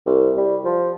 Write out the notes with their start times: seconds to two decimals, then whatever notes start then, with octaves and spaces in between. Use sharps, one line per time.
0.06 C2
0.37 G3
0.64 F3